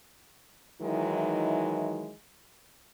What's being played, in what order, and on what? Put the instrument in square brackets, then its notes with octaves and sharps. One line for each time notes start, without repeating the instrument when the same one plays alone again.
[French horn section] D#3 E3 F#3 G#3 D#4 E4